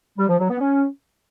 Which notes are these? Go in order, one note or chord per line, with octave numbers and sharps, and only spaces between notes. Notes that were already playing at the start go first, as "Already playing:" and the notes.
G3
F3
F#3
B3
C#4